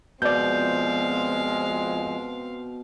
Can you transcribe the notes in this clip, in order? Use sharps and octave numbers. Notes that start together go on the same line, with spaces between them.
F2 B2 F3 G#3 C4 D5 F5 G6